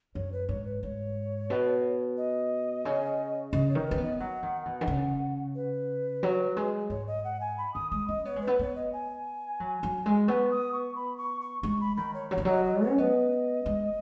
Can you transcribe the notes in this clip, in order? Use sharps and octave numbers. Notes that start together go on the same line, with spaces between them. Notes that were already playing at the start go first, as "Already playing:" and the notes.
F#2 C#5
B4
G#2 C#5
B4
G#2 C#5
B2
D#5
C#3
C#3 D#5
C#5
D#3
C#4 B4
B3
D#5
F#3 F#5
D#3
B2
D#3
C#3
B4
F#3
G#3
G#2 C#5
D#5
F#5
G#5
B5
D#3 D#6
G#3 D#6
C#4 D#5
B3 C#5
G#3
B4
B3
B3 C#5
D#5
G#5
F#3
F#3
G#3
B3 C#6
D#6
C#6
B5
C#6
C#6
G#3 C#6
B5
D#3 B5
C#5
F#3 C#5
D#3
F#3 D#5
D#5
C#5
C#4
B3 D#5
G#3